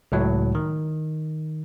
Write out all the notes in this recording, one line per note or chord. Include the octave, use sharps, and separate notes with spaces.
C#2 A2 F#3
D#3